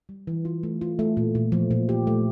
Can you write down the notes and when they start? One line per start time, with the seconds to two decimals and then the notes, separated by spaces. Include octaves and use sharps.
0.09 G3
0.27 E3
0.45 F4
0.63 A3
0.81 F4
0.99 A3
1.17 A#2
1.35 A#2
1.52 F3
1.71 A#2
1.89 G4
2.07 A3